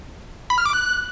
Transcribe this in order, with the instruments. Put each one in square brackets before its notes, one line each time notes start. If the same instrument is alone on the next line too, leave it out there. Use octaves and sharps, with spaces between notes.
[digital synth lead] B5
F6
D6
F#6